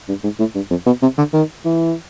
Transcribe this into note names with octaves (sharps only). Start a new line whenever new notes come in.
G2
G#2
A2
G2
F2
B2
C3
D3
D#3
E3